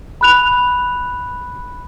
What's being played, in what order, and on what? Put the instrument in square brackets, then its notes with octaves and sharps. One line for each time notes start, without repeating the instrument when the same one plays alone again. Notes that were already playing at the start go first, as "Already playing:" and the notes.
[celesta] B5 F#6 F7